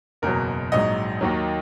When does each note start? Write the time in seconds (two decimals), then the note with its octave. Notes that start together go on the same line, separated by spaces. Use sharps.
0.22 F#1 E2 B2 F#3 A#4
0.72 A#1 G#2 F#3 D#5
1.21 D#2 D#3 F#3